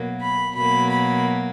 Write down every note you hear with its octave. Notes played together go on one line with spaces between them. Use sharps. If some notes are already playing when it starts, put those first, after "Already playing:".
Already playing: B2 F#3 A#3
B5
B2 F#3 A#3 B5
B5